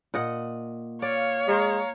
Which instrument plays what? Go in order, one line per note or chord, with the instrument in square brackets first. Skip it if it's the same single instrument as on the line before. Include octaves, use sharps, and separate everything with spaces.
[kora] A#2 D#5 F#5
[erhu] C#5 [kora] D5 [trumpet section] F5
[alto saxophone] G#3 [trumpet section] F5 A#5